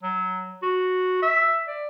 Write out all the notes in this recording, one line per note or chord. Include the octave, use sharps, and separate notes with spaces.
F#3
F#4
E5
D5